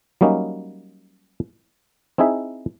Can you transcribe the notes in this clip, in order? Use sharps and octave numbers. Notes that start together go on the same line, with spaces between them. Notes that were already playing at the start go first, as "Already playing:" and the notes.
F#3 G3 A#3 C#4 D#4
C4 D#4 E4 G#4 E5